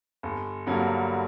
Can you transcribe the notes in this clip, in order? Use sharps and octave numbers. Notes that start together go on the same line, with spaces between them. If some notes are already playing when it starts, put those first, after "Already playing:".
G1
G2 D3 F#3 A#3